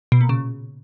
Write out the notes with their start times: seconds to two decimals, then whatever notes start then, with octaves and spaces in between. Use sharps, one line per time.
0.12 B2
0.21 A#2
0.29 C#3